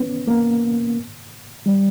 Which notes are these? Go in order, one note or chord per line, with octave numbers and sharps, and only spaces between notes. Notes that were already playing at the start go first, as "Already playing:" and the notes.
Already playing: B3 C#4
A#3
G3